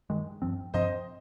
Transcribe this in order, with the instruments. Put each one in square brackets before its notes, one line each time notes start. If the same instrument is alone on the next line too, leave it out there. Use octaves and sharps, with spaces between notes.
[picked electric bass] G2 D#3 G#3
G2 F3 C4
[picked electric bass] G2 F3 C4 [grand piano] C5 D#5